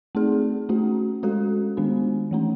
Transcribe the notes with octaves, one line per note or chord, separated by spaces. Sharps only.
A3 C4 D#4 G#4
A3 C#4 F#4
G#3 C#4 F#4 A4
D#3 G#3 B3 D4
E3 A3 C#4